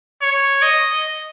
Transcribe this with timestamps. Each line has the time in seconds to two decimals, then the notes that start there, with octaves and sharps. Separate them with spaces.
0.22 C#5
0.62 D#5